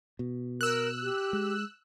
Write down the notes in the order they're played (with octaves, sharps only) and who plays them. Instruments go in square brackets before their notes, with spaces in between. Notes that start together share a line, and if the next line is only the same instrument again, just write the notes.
[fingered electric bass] B2
[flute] A#4 [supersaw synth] E6 F#6
[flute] G4
[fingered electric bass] G#3